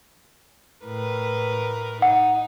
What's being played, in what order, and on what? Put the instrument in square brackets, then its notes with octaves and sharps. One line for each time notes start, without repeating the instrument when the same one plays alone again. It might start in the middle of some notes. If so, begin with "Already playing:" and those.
[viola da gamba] A2 A#4 B4
[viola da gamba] D#4 [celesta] F#5